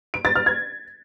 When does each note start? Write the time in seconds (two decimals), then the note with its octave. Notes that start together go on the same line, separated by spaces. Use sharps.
0.14 D7
0.25 A6
0.35 F6
0.46 G#6